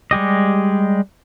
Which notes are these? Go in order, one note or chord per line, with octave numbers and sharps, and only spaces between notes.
G3 G#3 G4 D#5